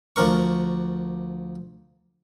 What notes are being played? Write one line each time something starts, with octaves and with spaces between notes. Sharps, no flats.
D2 F3 D4 A#4 C#6